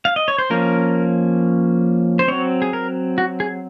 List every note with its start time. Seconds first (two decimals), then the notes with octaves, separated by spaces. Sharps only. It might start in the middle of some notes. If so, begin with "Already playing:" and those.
0.05 F5
0.16 D#5
0.28 C#5
0.39 C5
0.50 F3 A#3 C#4 A#4
2.19 C5
2.28 F#3 C4 C#5
2.62 G#4
2.73 A#4
3.18 F#4
3.40 G#4